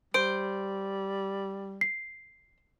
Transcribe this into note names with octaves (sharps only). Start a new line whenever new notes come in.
G3 C5 D7
C7